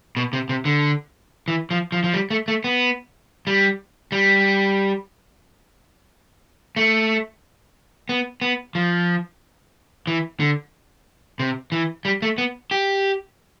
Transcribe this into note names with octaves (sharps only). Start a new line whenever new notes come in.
B2
C3
C3
D3
E3
F3
F3
F3
G3
A3
A3
B3
G3
G3
A3
B3
B3
F3
E3
D3
C3
E3
G3
A3
B3
G4